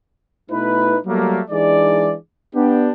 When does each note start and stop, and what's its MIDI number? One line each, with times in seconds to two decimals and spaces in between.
0.50 0.97 47
0.50 0.97 57
0.50 0.97 63
0.50 0.97 64
0.50 0.97 71
1.06 1.41 54
1.06 1.41 55
1.06 1.41 57
1.06 1.41 58
1.50 2.14 52
1.50 2.14 56
1.50 2.14 62
1.50 2.14 63
1.50 2.14 68
1.50 2.14 74
2.54 2.91 59
2.54 2.91 62
2.54 2.91 67